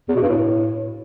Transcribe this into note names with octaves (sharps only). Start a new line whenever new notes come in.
E2
B2
G2
A2